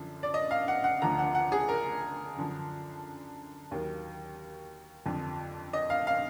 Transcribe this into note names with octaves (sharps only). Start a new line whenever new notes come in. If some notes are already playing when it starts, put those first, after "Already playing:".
Already playing: F#2 D3 F3
D5
D#5
F5
F#5
F#5
D2 D3 F3 A#5
F#5
F#5
G#4
A#4
F#2 D3 F3
D#2 D#3 F#3
F2 D3 F3
D#5
F5
F5